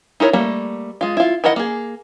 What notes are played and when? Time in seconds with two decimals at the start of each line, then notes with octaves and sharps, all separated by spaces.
0.20 D#4 E4 A#4 C#5
0.33 G3 A3 A#3
1.01 G#3 F4
1.17 E4 F4
1.44 D#3 E4 A#4 D#5 F#5
1.56 A#3 G#4